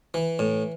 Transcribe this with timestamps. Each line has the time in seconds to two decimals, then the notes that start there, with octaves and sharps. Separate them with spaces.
0.14 E3
0.39 A2